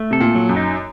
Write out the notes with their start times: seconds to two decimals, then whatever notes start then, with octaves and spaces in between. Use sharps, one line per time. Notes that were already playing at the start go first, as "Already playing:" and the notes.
Already playing: A3
0.11 C3 A4
0.21 A#2
0.35 F#3
0.49 F#2
0.57 D#4